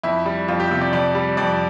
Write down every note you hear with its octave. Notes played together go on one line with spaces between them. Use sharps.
F2 E4
G3
F2 F4
G4
C3 F4
D5
F2 D5
G3
F2 D5